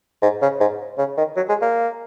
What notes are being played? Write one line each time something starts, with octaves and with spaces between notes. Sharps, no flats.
G#2
C#3
G#2
C#3
D#3
F#3
G#3
A#3